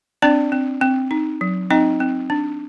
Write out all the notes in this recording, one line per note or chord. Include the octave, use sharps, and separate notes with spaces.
C4 D4 D5
C4
C4
D#4
F#3
C4 D#4 D#5
C4
D4